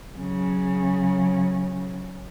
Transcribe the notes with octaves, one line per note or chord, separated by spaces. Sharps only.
C#3 F#3